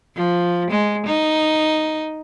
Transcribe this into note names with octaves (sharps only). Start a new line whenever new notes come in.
F3
G#3
D#4